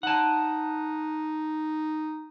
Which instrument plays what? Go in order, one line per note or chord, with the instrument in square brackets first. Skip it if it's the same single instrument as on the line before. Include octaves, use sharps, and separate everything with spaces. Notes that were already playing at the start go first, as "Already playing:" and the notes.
[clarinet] D#4 [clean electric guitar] F#5 A5